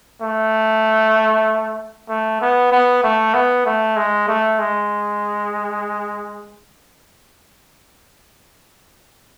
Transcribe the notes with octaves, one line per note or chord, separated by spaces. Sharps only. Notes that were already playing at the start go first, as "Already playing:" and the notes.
A3
A3
B3
B3
A3
B3
A3
G#3
A3
G#3